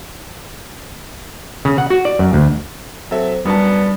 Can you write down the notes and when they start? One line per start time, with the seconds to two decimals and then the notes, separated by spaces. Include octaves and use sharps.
1.65 C#3
1.78 F#5
1.90 F#4
2.05 D5
2.19 F#2
2.33 D2
3.11 F#3 C4 A4 E5
3.45 F#2 G3 B3 D4 F#4 A5